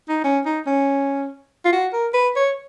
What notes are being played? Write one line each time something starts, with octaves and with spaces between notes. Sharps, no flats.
D#4
C#4
D#4
C#4
F4
F#4
A#4
B4
C#5